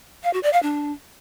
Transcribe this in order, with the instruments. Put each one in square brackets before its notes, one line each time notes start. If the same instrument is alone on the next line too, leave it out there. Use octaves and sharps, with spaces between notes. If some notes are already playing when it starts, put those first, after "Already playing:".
[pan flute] F5
F#4
D5
F5
D4